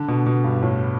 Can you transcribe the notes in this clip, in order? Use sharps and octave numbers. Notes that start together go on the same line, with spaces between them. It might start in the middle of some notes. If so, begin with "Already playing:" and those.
Already playing: D3
B2
B2
G2
A2